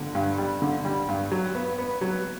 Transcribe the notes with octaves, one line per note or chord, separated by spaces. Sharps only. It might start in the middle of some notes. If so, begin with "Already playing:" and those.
Already playing: D3
G2
G3
D3
G3
G2
F#3
B3
B3
F#3